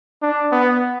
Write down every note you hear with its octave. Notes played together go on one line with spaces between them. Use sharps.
D4
B3